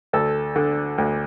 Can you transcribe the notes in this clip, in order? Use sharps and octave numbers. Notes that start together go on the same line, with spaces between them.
D2 A4
D3
D2